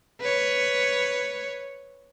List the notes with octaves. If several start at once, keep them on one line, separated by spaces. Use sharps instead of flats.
B4 C#5